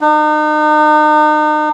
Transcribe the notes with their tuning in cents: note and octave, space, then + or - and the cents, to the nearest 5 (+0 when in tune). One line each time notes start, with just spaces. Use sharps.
D#4 -40